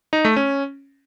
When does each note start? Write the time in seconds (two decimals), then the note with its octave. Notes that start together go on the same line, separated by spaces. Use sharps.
0.13 D#4
0.25 A3
0.36 C#4